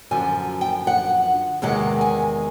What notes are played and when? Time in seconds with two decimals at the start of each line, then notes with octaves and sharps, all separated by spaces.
0.11 F#2 D3 F3 G#5
0.61 G5
0.87 F#5
1.62 E2 C3 D#3 G#3 F#5
2.01 G#5